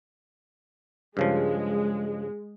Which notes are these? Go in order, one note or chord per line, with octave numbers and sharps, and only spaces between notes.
G2 C#3 F3 G#3